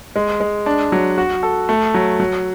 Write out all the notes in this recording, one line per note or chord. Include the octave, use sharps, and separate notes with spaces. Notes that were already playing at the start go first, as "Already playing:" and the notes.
G#3
G#3
D4
F#3
F#4
A4
A3
F#3
F#3